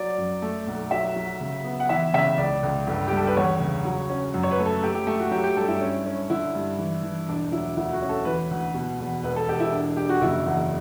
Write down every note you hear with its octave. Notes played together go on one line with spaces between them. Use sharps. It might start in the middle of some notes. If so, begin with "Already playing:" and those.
Already playing: F#3 D5
F#2
A3
B1
F#3 E5
F#3
C#3
B3
F#5
E3 E5
C#3 E5
C#2 D5
C#2
G1
G3 G4
A4
B4
E2 C#5
C#3
F#3
C#4
F#2
C#5
B4
A3
A4
A3 G4
G4
A3
F#4
F#3 G4
G4
G2 A4
E4
C#4
C#4
D3 E4
G2
E3
E3
E1 D4
F#3 E4
D2 E4
F#4
C#4
A4
E3 B4
D2
B2
E2
E1 B4
A4
E1 G4
E4
D4
D4 G4
F#4
F#1 E4
E2